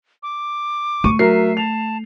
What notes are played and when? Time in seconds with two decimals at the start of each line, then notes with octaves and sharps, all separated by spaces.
0.23 D6
1.04 A3 C#6 D#7
1.19 F#3 A#4 E5 C7
1.57 A5 F7